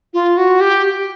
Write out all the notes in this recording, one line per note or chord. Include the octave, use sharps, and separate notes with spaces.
F4
F#4
G4